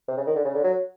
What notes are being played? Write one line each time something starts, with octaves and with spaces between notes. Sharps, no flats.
C3
C#3
D#3
D3
C#3
D3
F#3